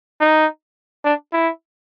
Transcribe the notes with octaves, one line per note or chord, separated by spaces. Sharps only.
D#4
D4
E4